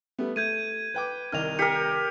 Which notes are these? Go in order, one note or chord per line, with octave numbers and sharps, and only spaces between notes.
G3 A3 B3
A3 G6 G#6 D#7
B4 G5 D6
C2 D#3 D#5 F6 F7
G4 A#4 C#7